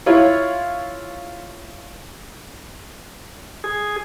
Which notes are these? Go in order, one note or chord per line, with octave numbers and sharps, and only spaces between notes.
E4 F4 C#5
G#4